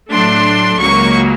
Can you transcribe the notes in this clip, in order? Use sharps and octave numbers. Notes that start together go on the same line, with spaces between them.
A2 F#3 A3 D4 C6
C#2 C#3 F#3 A#3 C#6